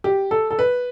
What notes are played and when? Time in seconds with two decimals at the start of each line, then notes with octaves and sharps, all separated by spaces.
0.04 G4
0.31 A4
0.51 A4
0.59 B4